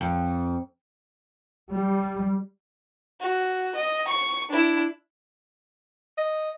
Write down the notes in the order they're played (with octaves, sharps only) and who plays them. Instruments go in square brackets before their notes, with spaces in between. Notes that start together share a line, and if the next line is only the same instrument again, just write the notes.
[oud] F2
[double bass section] G3
[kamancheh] F#4
D#5
C#6
D4 E4
[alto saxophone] D#5